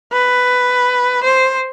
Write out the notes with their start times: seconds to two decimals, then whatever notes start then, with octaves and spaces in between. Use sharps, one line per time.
0.13 B4
1.24 C5